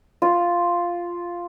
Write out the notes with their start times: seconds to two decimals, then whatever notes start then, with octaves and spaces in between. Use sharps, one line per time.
0.22 F4